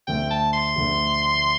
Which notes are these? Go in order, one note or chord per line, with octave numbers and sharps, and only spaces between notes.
D2 D3 A3 G5
A5
C6
D2 D3 A3